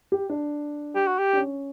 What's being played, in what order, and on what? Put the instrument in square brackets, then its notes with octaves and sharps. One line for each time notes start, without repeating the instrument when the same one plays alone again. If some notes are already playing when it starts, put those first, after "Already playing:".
[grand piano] G4
D4
[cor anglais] G4
F#4
G4
[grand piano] D4
C#4